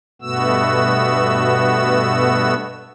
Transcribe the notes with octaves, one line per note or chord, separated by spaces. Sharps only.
G2 B2 A3 B3 F#4 E6